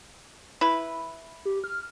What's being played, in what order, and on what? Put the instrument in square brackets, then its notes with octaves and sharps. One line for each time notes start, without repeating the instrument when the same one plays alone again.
[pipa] E4 B4
[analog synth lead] G4
F6